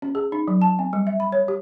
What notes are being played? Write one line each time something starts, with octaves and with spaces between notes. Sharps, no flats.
C#4
G#4
D#4
F#3
A5
C4
G3
E5
B5
C#5
G4